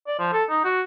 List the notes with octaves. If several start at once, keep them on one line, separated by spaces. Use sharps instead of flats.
D5
F3
A4
D#4
F#4